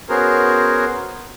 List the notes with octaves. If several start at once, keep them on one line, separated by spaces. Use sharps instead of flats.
B3 C#4 F#4 G#4 A#4 C5